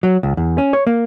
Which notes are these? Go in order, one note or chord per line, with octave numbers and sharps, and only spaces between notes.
F#3
C#2
E2
C#4
C#5
A#3